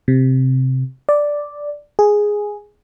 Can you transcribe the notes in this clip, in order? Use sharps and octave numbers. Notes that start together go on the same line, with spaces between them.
C3
D5
G#4